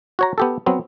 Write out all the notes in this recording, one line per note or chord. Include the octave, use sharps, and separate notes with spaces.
F#4 C#5 A#5
B3 G4 A4
F#3 B3 C4